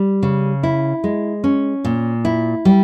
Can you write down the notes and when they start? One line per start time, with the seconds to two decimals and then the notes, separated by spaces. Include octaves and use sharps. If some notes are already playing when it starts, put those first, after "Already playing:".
Already playing: G3
0.23 C#3
0.63 E4
1.04 G#3
1.44 C#4
1.84 A#2
2.25 E4
2.65 G3